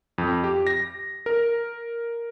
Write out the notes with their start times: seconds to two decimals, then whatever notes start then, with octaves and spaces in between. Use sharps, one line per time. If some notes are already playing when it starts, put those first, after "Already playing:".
0.18 F2
0.44 G4
0.67 A#6
1.26 A#4